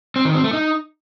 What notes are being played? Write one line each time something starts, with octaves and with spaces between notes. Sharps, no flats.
C4
D#3
C4
A3
D#4